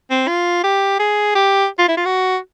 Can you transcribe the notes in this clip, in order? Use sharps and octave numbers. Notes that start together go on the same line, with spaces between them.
C4
F4
G4
G#4
G4
F4
E4
F4
F#4